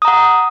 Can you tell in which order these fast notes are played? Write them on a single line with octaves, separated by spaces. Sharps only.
D#6 A#5 F#5